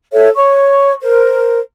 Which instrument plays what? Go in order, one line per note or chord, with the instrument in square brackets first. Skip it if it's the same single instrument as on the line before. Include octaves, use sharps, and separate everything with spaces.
[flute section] A4 C#5 E5
C#5 C#6
A#4 C5